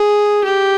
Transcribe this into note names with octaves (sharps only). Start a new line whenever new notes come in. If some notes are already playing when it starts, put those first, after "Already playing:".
Already playing: G#4
G4